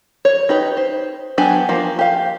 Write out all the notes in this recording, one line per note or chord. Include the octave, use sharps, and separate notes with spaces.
C#5
D#4 G4 B4
C5
F#3 B3 D4 G4 G#5
F3 A#3
G4 F5